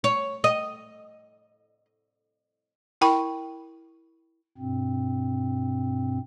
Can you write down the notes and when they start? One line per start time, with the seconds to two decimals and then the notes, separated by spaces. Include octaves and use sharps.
0.04 C#5
0.44 D#5
3.01 E4 A#4 G5 B5 C#6
4.58 G2 B2 C4